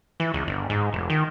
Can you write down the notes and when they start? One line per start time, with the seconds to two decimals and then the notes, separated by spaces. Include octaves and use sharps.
0.20 E3
0.34 C#2
0.47 G1
0.70 G#2
0.93 F1
1.10 D#3